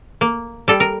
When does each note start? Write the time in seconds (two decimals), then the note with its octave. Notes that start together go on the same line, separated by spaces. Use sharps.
0.21 A#3
0.68 G3 A4
0.80 A#4